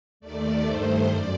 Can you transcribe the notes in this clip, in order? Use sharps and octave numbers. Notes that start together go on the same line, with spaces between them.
D#2 D#3 A3 D5
G2 D#3 A3 C5
F#2 D5